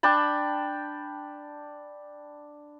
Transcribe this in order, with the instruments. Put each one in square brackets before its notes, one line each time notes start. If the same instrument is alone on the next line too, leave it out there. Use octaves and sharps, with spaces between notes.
[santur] D4 G5 A5 B5